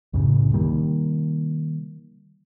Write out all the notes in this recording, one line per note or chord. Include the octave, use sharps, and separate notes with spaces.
C2 F#2 A2 C#3
C3 D#3 G3 A#3